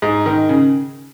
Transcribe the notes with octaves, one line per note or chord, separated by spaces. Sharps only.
G#2
D#3
C#3